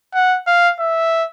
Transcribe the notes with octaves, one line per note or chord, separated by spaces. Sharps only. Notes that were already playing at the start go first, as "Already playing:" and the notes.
F#5
F5
E5